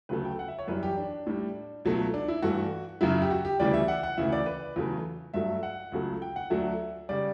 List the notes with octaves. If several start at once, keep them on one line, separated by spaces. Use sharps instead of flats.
D2 C#3 F#3 A3 B4
G5
F#5
E5
C#5
F#2 E3 G3 B4
G4
D4
A2 G3
C#2 B2 F#3 A3
D4
E4
G2 E3 A3 F#4
F#2 C#3 F#3 E4
G4
F#4
G4
D2 C#3 E3 G3 D5
E5
F#5
F#5
D2 C#3 E3 E5
D5
B4
E2 C#3 F#3 A3
G2 F#3 A3 E5
F#5
C#2 C#3 F#3 A3
G5
F#5
D2 D3 F#3 A3 E5
C#3 G3 D5